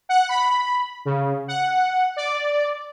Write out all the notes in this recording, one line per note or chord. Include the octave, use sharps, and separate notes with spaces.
F#5
B5
C#3
F#5
D5